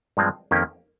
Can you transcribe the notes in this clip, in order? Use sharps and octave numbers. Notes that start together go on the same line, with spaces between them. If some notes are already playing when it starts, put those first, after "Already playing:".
G2 F3 G#3 C4
F2 D#3 A#3 C#4 G4